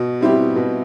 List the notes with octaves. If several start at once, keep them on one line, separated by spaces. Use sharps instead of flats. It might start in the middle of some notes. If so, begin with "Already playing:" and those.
Already playing: B2
G3 C4 E4 G4
B2